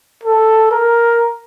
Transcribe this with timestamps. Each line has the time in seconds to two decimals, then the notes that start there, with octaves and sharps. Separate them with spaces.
0.23 A4
0.71 A#4